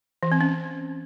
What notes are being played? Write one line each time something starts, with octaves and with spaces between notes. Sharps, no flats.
E3
C4
C#4